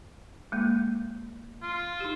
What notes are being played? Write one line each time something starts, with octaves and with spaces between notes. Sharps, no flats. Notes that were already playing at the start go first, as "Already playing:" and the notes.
G#3 A#3
F4
D#4 G4